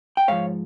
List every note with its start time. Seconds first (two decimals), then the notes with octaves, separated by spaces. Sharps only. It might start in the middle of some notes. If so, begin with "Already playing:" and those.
0.17 G5
0.28 G#2 F3 C#5 F5